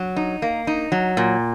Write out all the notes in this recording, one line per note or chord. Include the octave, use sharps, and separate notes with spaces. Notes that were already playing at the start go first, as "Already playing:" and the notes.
Already playing: F#3
D#4
A#3
D#4
F#3
A#2